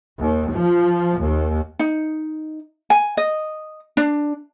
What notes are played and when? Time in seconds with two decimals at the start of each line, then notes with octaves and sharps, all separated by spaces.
0.18 D#2
0.53 F3
1.20 D#2
1.79 D#4
2.90 G#5
3.17 D#5
3.97 D4